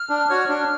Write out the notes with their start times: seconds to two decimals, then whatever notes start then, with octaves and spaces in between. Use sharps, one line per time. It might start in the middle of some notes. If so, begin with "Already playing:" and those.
Already playing: F6
0.10 D4
0.29 F#4 C#5
0.49 D4